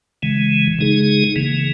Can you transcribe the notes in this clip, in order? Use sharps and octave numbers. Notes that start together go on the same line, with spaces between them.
C#3 E3 G#3
C#3 G#3 D#4 G#4
C#3 E3 A#3